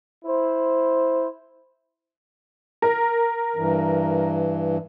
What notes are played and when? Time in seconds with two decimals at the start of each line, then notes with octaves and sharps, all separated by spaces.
0.25 E4 C5
2.82 A#4
3.56 G2 E3